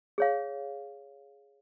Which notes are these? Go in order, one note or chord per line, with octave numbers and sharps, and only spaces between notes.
G#4 C#5 F5